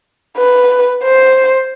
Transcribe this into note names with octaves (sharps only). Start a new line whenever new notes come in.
B4
C5